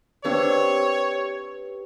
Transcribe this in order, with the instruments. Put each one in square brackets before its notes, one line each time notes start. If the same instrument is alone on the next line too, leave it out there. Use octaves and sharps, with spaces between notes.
[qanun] C4 D4 [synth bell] G4 B4 [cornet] C#5